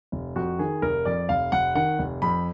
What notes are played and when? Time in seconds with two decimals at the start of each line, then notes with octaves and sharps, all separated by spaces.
0.12 F1
0.36 F2 F#4
0.59 D#3 G#4
0.82 F1 A#4
1.05 F2 D5
1.29 F1 F5
1.52 F1 F#5
1.75 D#3 F#5
1.99 F1
2.22 F2 B5